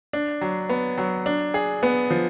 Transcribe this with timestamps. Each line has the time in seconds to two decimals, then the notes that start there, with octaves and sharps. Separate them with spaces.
0.13 D4
0.41 F#3
0.69 B3
0.98 F#3
1.26 D4
1.54 G#4
1.83 B3
2.10 F3